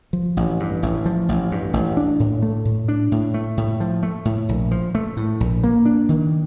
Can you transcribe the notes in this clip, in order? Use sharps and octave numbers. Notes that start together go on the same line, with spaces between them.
F3
A1
G2
A1
F3
A1
G2
A1
D4
A2
A3
A2
D4
A2
A3
A2
F3
A3
A2
A#1
F3
A3
A2
A#1
A#3
D4
D#3